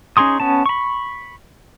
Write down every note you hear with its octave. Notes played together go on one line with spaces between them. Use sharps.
C#4 D#4 G#4 C6 D#6
B3 C#4 A5
B5 C#6